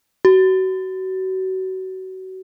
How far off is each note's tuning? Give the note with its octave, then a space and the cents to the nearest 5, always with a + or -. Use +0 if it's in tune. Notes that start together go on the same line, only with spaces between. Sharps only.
F#4 +30